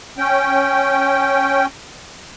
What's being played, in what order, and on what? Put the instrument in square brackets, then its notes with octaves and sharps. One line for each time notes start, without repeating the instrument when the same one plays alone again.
[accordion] C#4 G5